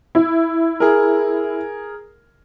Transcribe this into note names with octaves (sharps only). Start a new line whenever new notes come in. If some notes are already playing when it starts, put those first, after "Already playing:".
E4
G#4 A#4